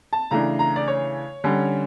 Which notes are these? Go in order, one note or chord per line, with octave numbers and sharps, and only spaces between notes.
A5
C#3 E3 A3 D4 A#5
A#5
D5
C#5
D3 G3 C#4